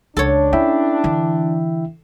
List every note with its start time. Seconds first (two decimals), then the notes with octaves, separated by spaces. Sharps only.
0.17 C#2 D4 A4 C#5
0.53 C#4 E4 E5 G5
1.04 D3 E3